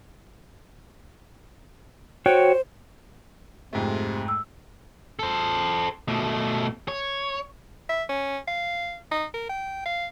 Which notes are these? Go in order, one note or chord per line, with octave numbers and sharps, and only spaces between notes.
F#4 C5 C#5 G5
F2 G#2 C3 A3
E6
A4 C5
B2 A3
C#5
E5
C#4
F5
D#4
A#4
G5
F5